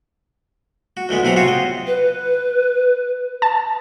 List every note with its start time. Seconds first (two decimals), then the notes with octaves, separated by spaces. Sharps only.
0.97 F#4
1.09 D2 E3 G#3 B3
1.23 B1 C3 E4 G#4 F#5 A#5
1.36 C4 F4 F#4 C5 C#5
1.48 D#5
1.87 B4
3.42 A5